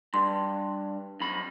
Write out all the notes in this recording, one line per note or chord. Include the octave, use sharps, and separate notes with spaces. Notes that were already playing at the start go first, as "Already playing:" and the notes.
G2 C6
F#2 B5